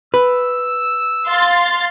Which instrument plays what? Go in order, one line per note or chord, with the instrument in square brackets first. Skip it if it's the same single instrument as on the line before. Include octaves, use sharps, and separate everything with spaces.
[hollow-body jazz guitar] B4 [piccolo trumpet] E6
[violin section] F5 C6 A6